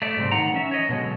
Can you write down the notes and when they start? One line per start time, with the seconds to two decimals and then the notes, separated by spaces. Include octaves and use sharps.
0.02 A3 D5
0.17 G#2 C3 G3 C4
0.31 A2 D#3 D4 D#4 F#5 A#5
0.53 E3 C#4 E5
0.71 C#5 D#5
0.89 B2 D3 F#3 G#3